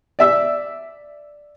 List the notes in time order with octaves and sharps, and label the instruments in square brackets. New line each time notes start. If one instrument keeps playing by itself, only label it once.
[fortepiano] D5 E5 E6